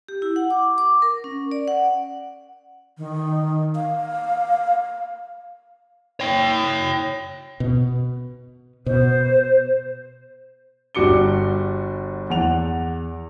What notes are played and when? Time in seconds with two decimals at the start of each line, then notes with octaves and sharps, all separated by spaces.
0.08 G4
0.22 E4
0.36 F#5
0.50 D6
0.78 D6
1.02 A#4
1.24 C#4
1.51 D5
1.68 F#5
2.98 D#3
3.75 F5
6.20 C#5 G5
7.60 B2
8.86 B2 C5
10.95 G1 G3 F#4 D6 C#7 G7
12.30 E2 F#5 F7